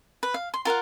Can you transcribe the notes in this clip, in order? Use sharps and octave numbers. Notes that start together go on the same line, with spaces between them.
B4
F5
C6
F4 A#4 F5 F#5